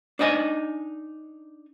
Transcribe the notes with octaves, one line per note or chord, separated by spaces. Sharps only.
D4 D#4 D#5 G#5